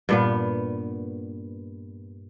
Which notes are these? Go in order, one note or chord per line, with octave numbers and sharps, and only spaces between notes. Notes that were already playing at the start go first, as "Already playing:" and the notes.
G2 A#2 B3